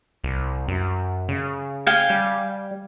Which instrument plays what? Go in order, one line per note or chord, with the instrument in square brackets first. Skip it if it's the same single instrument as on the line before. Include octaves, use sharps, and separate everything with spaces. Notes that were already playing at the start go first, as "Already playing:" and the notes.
[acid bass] C2
F#2
C#3
[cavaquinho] F5 G5 G#5
[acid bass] G3